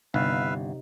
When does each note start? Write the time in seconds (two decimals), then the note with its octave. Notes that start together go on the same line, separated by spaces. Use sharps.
0.14 G1 C3 D#4 B4 E5 F5